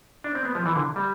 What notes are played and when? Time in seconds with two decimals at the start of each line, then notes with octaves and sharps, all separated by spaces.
0.24 D4
0.35 C4
0.45 B3
0.55 F3
0.66 E3
0.75 D3
0.96 G3